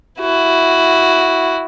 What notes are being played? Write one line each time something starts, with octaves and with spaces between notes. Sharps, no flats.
E4 F#4